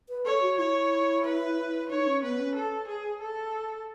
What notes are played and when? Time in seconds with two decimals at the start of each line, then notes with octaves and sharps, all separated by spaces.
0.09 B4
0.25 A4 C#5
0.42 F#4
0.58 E4 C#5
1.24 B4
1.89 D#4 C#5
2.06 C#4
2.22 B3 B4
2.39 C#4
2.55 A4
2.88 G#4
3.21 A4